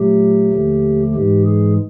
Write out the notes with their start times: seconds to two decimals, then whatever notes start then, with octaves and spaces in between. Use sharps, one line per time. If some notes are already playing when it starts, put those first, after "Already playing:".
Already playing: A#2 F#3 A3 G4
0.52 D#2 D3 F3 A3
1.14 G#2 E3 G#3 G4
1.46 G#4